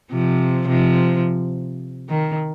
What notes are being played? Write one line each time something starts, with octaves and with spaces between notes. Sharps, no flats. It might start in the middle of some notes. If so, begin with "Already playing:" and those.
C3 F3
C3 F3
D#3